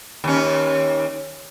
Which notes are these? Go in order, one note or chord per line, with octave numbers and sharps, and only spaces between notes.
D#2 C#4